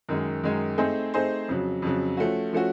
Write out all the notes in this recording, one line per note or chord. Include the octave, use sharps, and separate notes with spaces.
F#2 D#3 G#3
F#2 D#3 G#3
A3 C4 D#4 G#4 C5
A3 C4 D#4 G#4 C5
F2 C#3 F#3
F2 C#3 F#3
F3 A3 C#4 F#4
F3 A3 C#4 F#4